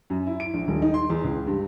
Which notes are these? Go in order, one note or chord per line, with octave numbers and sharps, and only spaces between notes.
F#2
E4
D7
A#1
D#1
D#4
C6
E2
C#2
G2